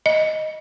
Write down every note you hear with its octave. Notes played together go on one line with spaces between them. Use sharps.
D#5